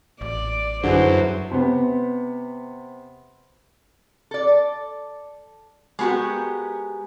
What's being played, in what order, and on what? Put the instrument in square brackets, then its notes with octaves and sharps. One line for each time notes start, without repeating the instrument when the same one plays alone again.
[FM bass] A1 [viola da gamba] D5
[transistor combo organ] F#2 [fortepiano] D3 G#4 [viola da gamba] E4 B4 C5
[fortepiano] C3 B3
[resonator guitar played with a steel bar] A4 D5
G#3 B3 F#4 G4 A#4